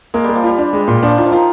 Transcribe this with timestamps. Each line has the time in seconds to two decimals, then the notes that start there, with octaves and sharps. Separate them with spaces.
0.14 G#3 A#3
0.24 G3 A#3
0.36 F3
0.43 G3 F4
0.58 D4
0.73 G#3
0.88 A#2
1.03 F3 D4
1.18 D#3 F4
1.26 F3
1.32 D#3 F4